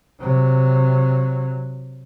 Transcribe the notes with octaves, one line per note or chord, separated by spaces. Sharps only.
C3 F#3